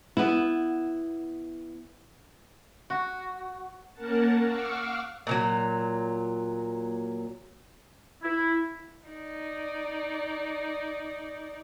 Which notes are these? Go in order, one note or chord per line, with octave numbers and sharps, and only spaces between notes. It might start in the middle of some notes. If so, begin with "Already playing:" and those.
B3 E4
F#4
A#3 C#4 A#4 F#5 A5
F5 F#5 C#6 D6 E6 F6
A#2 E3 F#3
E4
D#4 D5